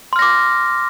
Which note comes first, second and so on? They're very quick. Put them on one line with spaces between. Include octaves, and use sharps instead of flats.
C6 F6 A#6 D6